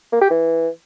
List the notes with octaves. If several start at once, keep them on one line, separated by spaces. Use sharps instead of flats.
A#3
G4
E3